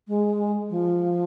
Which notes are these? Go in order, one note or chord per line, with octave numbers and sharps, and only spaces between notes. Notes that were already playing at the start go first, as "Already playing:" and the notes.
G#3
F3